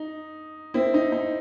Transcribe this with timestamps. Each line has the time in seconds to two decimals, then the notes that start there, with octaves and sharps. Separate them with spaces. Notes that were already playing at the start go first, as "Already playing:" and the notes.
Already playing: D#4
0.74 C4 E4
0.94 D#4
1.12 D#4